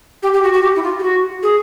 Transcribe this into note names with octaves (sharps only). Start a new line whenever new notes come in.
G4
G4
F#4
F#4
G4
E4
F4
G4
F#4
G#4